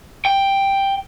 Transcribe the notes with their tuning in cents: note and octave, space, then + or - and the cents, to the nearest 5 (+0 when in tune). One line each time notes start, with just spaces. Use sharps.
G5 +5